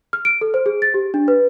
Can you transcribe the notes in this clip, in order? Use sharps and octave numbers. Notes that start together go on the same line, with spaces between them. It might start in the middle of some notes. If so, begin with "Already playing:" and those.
F6
D7
A4
C5
G#4
A6
G4
D4
B4